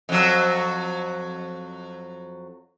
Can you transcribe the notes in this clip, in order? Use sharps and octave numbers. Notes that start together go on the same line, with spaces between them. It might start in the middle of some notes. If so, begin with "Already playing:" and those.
F2 F#3